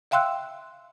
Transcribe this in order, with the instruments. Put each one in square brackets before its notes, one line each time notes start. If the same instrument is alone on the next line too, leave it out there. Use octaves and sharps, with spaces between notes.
[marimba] E5 F5 G5 C6 E6 F#6